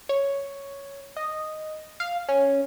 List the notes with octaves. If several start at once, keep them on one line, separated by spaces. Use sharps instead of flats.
C#5
D#5
F5
C#4